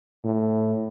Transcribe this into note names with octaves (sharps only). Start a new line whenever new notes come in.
A2